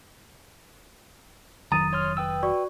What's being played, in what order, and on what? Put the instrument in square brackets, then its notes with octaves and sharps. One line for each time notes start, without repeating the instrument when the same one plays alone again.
[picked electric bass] F1 D#3 F#3 [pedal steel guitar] A#5 [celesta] D#6 A6 D#7
[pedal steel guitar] C#5 C6 F6
B4 G5 E6
[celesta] F#4 D5 C#6